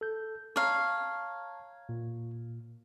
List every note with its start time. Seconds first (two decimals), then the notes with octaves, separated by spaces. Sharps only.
0.01 A4 G6
0.56 C#5 F5 A5 A#5
1.89 A#2